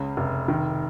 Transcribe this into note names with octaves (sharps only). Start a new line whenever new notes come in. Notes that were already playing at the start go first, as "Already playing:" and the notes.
Already playing: C#2 C#3
F1
D#3